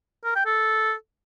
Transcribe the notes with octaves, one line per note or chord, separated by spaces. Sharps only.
A#4
G5
A4